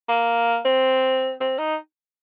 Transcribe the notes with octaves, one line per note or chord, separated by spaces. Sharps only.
A#3
C4
C4
D#4